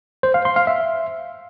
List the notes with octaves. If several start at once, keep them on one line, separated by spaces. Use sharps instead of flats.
C5
F5
C6
F5
E5